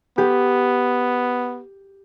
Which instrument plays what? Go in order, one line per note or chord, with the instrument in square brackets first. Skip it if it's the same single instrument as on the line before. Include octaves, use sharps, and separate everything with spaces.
[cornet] B3 [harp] G4